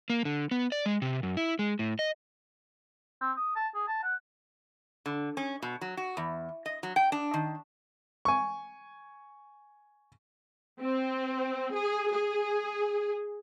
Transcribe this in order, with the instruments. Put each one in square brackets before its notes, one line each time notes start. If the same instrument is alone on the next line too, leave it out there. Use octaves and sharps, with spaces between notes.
[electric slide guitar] A#3
D3
B3
D5
G#3
C3
F#2
E4
G#3
A2
D#5
[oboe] C4
D#6
A5
G#4
A5
F#5
[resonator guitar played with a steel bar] D3
C#4
B2
F#3
F#4
E2
D#5
F#3
G5
D4
D#3
[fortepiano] G#5 C#6
[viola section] C4
G#4
G#4